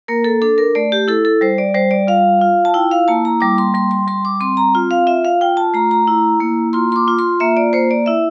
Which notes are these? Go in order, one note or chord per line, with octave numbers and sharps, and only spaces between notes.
A#3 A#4
A4
D4 A4
A#4
A3 D5
G4
E4 A4
A4
G3 C5
D5
G3 C5
D5
F4 F5
F4
A5
E4 G5
F5
A#3 A5
A#5
G3 D6
C6
G3 C6
C6
G3 C6
D6
C4 C6
A#5
F4
F5
F4 E5
F5
F4 G5
A5
A3 A#5
A#5
E4
A#3
F4 C6
C6
D6
F4
C6
A#3 E5
D5
A#3 C5
D5
E4 E5